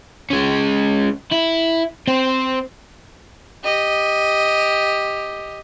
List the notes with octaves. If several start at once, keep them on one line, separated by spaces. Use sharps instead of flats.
G#3 C#4
E4
C4 C5
G4 D#5